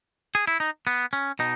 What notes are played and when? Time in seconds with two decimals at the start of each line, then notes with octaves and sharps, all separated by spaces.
0.35 G#4
0.47 E4
0.60 D#4
0.87 B3
1.13 C#4
1.39 B2 D#4